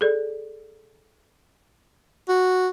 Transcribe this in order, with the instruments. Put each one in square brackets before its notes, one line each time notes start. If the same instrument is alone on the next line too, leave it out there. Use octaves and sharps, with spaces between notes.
[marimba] G#4 A4 D5
[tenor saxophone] F#4